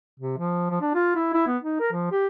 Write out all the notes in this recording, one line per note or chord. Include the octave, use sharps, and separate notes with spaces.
C3
F3
F3
D4
F4
E4
E4
B3
D#4
A#4
F3
G4